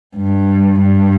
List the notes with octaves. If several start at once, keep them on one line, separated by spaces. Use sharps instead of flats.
G2
G2